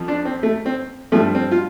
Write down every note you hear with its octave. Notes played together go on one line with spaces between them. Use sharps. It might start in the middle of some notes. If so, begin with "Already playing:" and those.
Already playing: F2 F3
D4
C4
A3
C4
G2 F3 A3
C4
F4